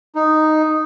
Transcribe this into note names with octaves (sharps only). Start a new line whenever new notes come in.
D#4